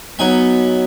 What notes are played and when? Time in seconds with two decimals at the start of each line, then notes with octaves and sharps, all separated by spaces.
0.19 F#3 B3 D#4 G#5